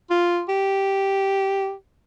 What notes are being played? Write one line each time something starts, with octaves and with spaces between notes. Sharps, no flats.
F4
G4